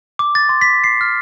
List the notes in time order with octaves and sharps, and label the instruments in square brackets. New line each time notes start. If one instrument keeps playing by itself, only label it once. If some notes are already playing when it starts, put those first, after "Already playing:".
[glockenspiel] D6
A6
C6
B6
C7
F6